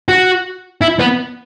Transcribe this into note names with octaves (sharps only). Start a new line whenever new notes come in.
F#4
E4
B3